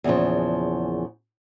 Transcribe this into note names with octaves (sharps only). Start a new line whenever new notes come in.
E2 A#2 C#3 F3